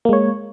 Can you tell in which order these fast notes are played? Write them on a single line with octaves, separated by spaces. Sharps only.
A#3 G#3 C#5